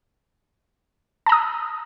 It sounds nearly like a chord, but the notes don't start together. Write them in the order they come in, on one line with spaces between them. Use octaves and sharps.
A5 A#5 D#6